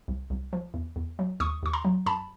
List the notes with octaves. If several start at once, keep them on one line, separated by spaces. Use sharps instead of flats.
C2
C2
F3
E2
E2
F#3
D#2 C#6 D#6
D#2 C#6
A#5 C6
F#3
F#2 A5 B5